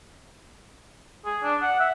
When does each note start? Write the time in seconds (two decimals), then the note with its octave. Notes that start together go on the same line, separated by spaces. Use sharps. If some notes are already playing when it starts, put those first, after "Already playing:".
1.25 G#4
1.44 D4
1.62 F#5
1.80 E5